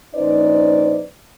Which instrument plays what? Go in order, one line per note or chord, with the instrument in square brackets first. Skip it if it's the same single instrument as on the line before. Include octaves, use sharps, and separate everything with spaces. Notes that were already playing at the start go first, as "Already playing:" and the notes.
[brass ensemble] A#1 C#4 D#4 B4 C5 D5